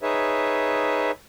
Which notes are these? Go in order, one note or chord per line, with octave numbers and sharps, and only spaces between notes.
D#4 G#4 B4 C#5 E5